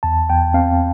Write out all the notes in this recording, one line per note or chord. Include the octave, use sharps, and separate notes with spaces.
E2 A5
E2 G5
C4 F5